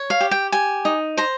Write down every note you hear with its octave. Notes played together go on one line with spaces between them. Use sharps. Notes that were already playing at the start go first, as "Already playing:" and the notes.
Already playing: C#5
F5
G4
G5
G4 G#5
D#4
C5 A#5